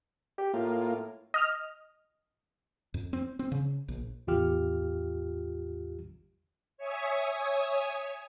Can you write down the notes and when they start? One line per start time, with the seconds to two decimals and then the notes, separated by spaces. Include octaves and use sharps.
0.38 G4
0.54 A2 A#3 F4
1.34 D#5 F6
2.94 F2
3.13 C4
3.39 C4
3.52 C#3
3.88 A#1
4.27 A1 E2 F4 G4 F6
6.78 C#5 E5 G#5 D#6 G#6